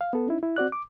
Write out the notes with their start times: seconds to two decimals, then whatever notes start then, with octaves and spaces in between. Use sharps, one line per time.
0.01 F5
0.13 B3 A4
0.27 C#4 D#4 E4
0.43 E4
0.56 C4 F#4 D5 F#6
0.72 D6